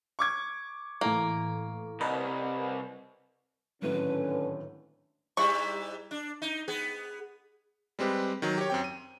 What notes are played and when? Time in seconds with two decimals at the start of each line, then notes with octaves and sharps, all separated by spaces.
0.19 C#6 D6 G#6
1.01 A2 E3 A3 A#3
2.01 C2 A#4 B4 D#5
3.82 G#1 A2 D3 F#3 C#4 B4
5.37 G#2 G3 E4 C#6
6.11 D4
6.42 D#4
6.68 B3 G#4
7.99 G3 G#3 C4 G4 B4
8.42 D#3 F#3
8.58 G4 C#5
8.70 F#2 C4 G5
8.84 D#7